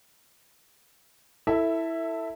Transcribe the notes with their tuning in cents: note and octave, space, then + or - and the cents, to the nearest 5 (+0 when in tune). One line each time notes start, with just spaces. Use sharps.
E4 +0 A4 +15 E5 -5